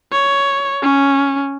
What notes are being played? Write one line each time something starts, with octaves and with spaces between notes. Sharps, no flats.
C#5
C#4